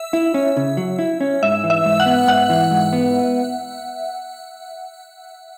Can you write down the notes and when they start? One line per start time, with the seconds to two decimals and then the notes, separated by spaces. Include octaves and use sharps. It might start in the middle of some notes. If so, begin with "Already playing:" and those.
Already playing: E5
0.13 E4
0.34 C#4
0.57 C#3
0.77 F#3
0.99 E4
1.21 C#4
1.43 G#2 E5
1.64 E3
1.70 E5
1.86 G#2
2.00 F#5
2.06 B3
2.27 G#2 F#5
2.49 E3
2.71 G#2
2.93 B3